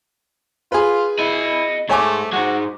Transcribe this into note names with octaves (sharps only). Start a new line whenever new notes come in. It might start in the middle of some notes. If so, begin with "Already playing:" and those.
F4 G#4 B4
E4 D#5 B5
G#2 A3 C#5 G#5 D6
G#2 G#3 F#4